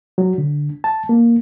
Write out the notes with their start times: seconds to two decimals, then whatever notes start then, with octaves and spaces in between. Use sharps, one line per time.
0.18 F#3
0.38 D3
0.84 A5
1.09 A#3